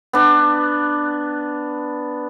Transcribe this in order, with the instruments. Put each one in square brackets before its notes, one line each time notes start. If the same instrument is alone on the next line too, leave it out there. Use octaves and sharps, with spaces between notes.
[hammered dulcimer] B3 D4